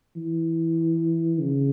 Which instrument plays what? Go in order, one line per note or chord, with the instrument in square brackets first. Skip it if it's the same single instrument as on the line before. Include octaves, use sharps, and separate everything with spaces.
[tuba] E3
C#3